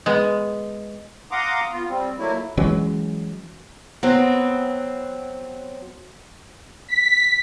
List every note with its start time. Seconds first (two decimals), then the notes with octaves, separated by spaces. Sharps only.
0.06 G#3 B3
1.31 F5 F#5 A#5 C6 D6 D#6
1.71 B3 F4
1.88 G3 C4
2.18 F#3 A3 A#3 E4
2.57 E3 F#3 G#3 C#4
4.03 F#3 B3 C4
6.88 B6